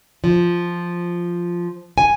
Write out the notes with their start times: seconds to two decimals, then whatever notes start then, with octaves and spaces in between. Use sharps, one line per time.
0.24 F3
1.98 G#5